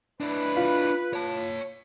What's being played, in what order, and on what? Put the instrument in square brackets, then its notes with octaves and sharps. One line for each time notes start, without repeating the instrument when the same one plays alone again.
[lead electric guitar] D4 E4 [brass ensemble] B4
[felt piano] F4 F5
[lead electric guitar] C#5 A5